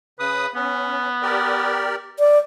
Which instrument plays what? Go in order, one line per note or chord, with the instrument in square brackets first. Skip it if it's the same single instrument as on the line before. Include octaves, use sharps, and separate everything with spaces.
[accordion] C#3 D#6 [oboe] B4
[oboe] B3 [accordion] C#4
[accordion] G4 A#4 D5
[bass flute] D5